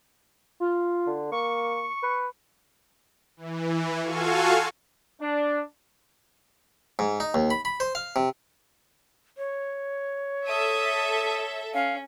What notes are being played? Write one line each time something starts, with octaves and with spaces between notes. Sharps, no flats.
F4
D3
A#3 C#6
B4
E3
F4 F#4 A4 F5 G#5 C#6
D4
G#2
D#4
D#2
B5
B5
C5
F5
C3
C#5
A4 E5 D#6
C#4 F5